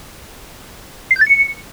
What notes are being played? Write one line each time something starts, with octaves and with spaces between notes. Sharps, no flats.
C7
G6
A6
C#7